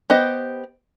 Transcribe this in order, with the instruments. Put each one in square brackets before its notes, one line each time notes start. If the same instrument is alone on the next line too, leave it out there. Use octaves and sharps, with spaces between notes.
[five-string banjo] B3 G4 C5 D#5